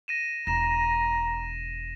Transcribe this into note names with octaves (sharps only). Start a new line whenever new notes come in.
A#6 D#7 E7
E1 A#5 A#6 E7